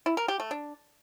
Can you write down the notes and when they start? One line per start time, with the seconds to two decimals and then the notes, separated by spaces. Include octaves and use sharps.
0.06 E4
0.17 A#4
0.28 G4
0.40 A3
0.51 D4